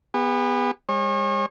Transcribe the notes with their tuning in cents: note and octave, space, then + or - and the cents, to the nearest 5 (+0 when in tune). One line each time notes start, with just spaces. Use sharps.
B3 +0 G#4 -40
G#3 -40 C#5 -35